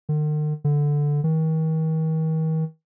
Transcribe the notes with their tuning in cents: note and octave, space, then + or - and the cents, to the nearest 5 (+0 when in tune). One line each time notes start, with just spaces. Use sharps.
D#3 -45
D3 -5
D#3 +40